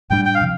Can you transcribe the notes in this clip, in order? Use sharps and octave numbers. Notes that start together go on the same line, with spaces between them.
A2 G3 D4 G5
G5
F5
C3 F3